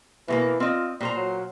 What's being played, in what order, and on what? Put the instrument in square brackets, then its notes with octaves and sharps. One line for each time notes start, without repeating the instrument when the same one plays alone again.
[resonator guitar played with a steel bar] B2 G#3 A#3 [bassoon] E3
[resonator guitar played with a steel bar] C4 D#5 [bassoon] F4
[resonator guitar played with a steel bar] A#2 C5 A#5 [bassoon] G3
[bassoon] F#3